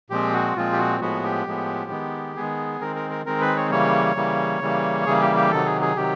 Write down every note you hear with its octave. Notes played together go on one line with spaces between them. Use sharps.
A#2 F3 G#3 C4 G4
F#4
A#2 F3 G#3 C4 F4
G4
F#4
A2 F3 G#3 B3 F#4
G4
A2 F3 G#3 B3
D#3 G#3 B3
D#3 G#3 B3 G#4
D#3 G#3 C4 A#4
A#4
A#4
D#3 G#3 C4 A#4
B4
C#5
C#3 E3 G3 A#3 C#5
C#3 E3 G3 A#3
C#3 E3 G3 A#3
C#3 E3 G3 A#3 G#4
G4
G4
C3 D#3 F#3 A4
G#4
G#4
C3 D#3 F#3 G4